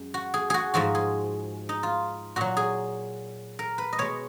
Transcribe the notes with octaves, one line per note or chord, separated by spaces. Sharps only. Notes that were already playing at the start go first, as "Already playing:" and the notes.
Already playing: F#2 G#3
F#4
G#4
F#4 G#4
G#2 F3 G#3 F#4
G#4
D#4
F4
A#2 F#3 F#4
G#4
A#4
B4
D#5
B2 G#3 C#5